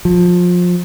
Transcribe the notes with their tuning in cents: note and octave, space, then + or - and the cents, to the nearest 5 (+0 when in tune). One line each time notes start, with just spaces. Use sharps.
F3 +25